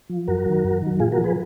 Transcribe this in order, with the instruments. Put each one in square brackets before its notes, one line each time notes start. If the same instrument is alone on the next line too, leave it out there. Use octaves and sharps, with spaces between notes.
[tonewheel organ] F3
F#2 F#4 A#4
D#3 F#3
F#2
D#3 F#3
A#2 F4 G#4
F#4 A#4
F3
G#4 B4